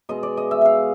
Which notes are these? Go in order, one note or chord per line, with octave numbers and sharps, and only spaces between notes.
B2 G#3 D#5
D5
D#5
E5
E5 F5